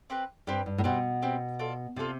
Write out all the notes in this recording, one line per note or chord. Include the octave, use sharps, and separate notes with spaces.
C4 G4 B4
G2 C4 G4 B4
G2
A2
B2 C4 G4 B4
C4 G4 B4
F4 A4 D5
C3 F4 A4 D5